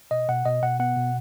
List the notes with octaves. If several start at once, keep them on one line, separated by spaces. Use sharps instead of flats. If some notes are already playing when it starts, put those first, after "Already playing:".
B2 D#5
B2 F#5
B2 D#5
B2 F#5
B3 F#5
B2